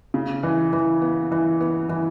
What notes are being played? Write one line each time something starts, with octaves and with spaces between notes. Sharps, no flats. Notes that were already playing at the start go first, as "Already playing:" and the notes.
C#3
E3
E3
B3
E3
B3
E3